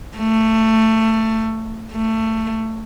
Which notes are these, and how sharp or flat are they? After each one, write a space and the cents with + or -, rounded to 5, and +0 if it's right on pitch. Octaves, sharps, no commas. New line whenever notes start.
A3 +15
A3 +20